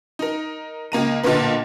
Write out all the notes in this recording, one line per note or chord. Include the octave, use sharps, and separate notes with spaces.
D#4 A#4
C#2 A#3 A#5 D#7
B1 A#2 D3 A#3 B4